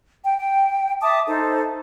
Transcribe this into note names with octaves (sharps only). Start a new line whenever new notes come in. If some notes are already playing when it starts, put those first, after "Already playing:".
G5
G5
E5 A5 D6 D#6
D#4 A4 C5